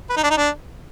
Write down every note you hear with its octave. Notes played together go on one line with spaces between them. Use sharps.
B4
D#4
D4
D#4
D4